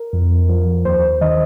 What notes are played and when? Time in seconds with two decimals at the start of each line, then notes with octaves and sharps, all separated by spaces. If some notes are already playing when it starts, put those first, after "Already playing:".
Already playing: A#4
0.13 F2
0.49 F3
0.85 D#2 C5
1.21 D#3 D#5